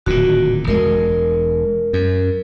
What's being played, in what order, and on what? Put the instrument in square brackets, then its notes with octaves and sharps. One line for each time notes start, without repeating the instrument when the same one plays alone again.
[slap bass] D1 A#2 D#3 [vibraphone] F#4
[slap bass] E1 G#3 [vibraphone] A#4
[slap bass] F#2